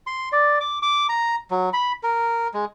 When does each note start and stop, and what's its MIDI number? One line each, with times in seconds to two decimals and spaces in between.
0.07 0.29 84
0.32 0.59 74
0.60 0.79 86
0.82 1.06 86
1.09 1.36 82
1.51 1.69 54
1.73 1.92 83
2.03 2.48 70
2.54 2.65 56